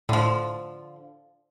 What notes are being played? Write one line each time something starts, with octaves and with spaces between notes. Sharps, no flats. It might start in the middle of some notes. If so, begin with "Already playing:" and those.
A2 D3 F3